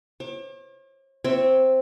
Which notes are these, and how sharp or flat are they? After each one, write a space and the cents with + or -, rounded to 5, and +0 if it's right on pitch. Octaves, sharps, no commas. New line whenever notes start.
C#5 -45 D6 +20
C4 +0 C#5 +0 E5 +0